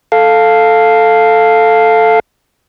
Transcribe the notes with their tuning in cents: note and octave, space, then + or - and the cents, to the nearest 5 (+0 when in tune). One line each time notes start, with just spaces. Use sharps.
A4 +0 F5 +0